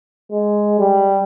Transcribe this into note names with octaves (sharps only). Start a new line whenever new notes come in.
G#3
G3